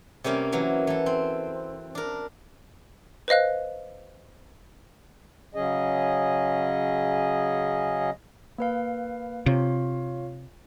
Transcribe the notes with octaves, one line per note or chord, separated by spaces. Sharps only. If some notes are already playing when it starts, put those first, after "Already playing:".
C3 G3 A#3 C#4
E3 F#3 A#3
E3 A4
C4
D4 A#4
B4 C5 D#5 F5 F#6
C#3 F#3 C#4 G#4 D#5
A#3 B4 F5
C3 F4 C#5 F5